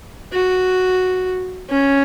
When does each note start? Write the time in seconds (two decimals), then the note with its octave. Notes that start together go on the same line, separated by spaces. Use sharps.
0.32 F#4
1.69 C#4